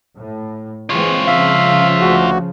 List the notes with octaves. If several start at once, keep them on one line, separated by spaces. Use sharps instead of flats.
A2
E3 G#3 C4 F4 C#5
C#3 F3 E5 F5
D2 F#4